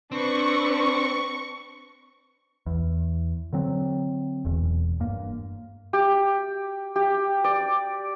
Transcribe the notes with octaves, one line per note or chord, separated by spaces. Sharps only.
C4 D4 B4 C#6
E2
D3 F#3 C4
E1 E2
G2 A#3
G4
G4
D5